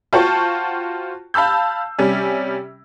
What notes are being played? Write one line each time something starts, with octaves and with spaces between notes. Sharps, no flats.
F4 F#4 C5 G5 A5 C#6
F5 A5 B5 E6 G6
C3 G3 C#4